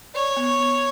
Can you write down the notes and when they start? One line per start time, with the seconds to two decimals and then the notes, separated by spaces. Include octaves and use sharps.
0.14 C#5 D5
0.36 B3
0.59 B3